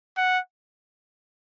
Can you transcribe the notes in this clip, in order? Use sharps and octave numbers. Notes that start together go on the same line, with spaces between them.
F#5